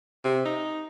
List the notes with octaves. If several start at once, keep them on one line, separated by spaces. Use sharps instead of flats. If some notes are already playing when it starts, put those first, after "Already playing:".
C3
D#4